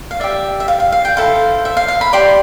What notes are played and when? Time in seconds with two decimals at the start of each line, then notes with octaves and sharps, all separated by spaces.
0.11 F5
0.20 G4 D5 E5
0.60 E5
0.68 F5
0.80 F5
0.92 F5
1.05 G5
1.17 E4 A4 C5 F5
1.65 E5
1.77 F5
1.88 F5
2.01 B5
2.13 G4 D5 C6